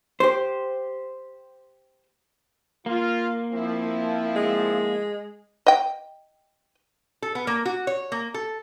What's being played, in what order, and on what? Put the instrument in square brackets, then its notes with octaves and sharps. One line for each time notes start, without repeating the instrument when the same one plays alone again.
[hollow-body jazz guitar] G4 C5
[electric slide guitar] A#3 [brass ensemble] F4
[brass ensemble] F3 C4 E4
[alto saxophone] G#3
[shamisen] D#5 G5
[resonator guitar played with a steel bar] A4
B3
A#3
F#4
C#5
A#3
A4